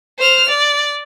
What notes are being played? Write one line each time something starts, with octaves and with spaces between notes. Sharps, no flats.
C5 F6
D5